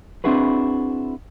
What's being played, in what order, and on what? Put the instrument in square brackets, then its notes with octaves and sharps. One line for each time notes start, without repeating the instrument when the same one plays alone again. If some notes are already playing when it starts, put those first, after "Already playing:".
[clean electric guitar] C4 D4 E4 F#4 G#4 B4